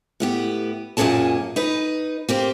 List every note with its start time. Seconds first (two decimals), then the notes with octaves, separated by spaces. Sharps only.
0.20 A2 B3 G4
0.97 F#2 A#2 A#3 C#4 G#4 A5
1.56 D#4 B4
2.29 A#3 C4 G4